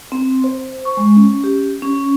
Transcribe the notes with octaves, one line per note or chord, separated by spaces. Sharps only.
C4
C5
C#6
G#3
C#4
G4
C#4